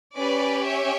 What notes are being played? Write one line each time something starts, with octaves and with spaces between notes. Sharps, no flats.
C#4 G4 B4 D5
C#5 E5